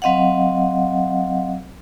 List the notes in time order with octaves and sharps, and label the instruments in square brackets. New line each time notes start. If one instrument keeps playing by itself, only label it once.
[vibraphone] F#3 C4 D#5 F5 F#5